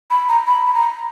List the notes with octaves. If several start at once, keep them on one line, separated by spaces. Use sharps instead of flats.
B5
A#5
B5
B5
A#5